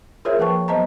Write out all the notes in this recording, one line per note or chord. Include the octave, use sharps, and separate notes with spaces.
F4 G#4 A#4 C5 C#5 E5
F3 A#3 B4 G5 A5 C#6
F#3 B3 C5 D#5 A5 A#5